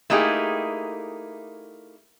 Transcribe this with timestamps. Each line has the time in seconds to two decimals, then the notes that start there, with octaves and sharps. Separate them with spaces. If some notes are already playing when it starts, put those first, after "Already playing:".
0.10 A3 A#3 D#4 E4 G4 G#4